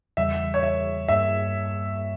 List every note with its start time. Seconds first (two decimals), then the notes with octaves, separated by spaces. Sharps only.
0.17 E2 C#3 E3 G3 E5
0.54 C#5
0.63 E5
1.08 G2 G3 A#3 E5